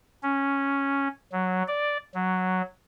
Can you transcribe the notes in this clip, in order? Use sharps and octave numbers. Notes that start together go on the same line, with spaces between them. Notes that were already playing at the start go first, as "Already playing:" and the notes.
C#4
F#3
D5
F#3